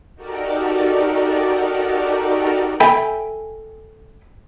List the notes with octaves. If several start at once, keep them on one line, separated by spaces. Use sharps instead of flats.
D#4 F#4 G4 A4 A#4 D5
A4 E5 G5 G#5 B5